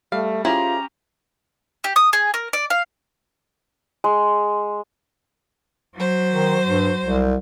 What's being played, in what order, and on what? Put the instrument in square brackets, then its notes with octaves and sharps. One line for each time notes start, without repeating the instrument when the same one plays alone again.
[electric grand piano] G3 [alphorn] A3 [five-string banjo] F5
[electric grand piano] C#4 G4 [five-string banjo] E4 G#4 C5 [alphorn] F4 [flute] A#5
[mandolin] G4
D#6
G#4
A#4
D5
F5
[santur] G#3
[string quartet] F#3 C5
[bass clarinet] D#3
G2
C2